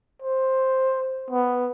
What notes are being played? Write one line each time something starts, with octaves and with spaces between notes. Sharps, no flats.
C5
B3